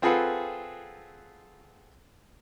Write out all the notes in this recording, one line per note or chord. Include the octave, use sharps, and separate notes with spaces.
C4 F4 G#4 A4 B4 F#5